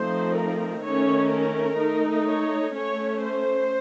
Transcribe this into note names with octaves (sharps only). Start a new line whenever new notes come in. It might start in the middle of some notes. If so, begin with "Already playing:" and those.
Already playing: F3 A3 C4 D#4 C5
A#4
D#3 A3 C#4 C#5
A#4
A3 D#4
C#5
A3 C#4 C#5
C5